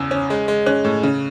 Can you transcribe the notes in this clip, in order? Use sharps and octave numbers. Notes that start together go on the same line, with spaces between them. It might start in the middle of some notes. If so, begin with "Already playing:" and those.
Already playing: E2 C#3 D#6 E6
C#4
G#3
G#3
C#4 F#6
A2
C#3